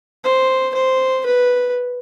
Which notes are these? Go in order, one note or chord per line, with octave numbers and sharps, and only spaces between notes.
C5
C5
B4